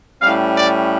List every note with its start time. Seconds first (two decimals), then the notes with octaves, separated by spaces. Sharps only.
0.22 A2 G3 C#4 F5
0.56 D5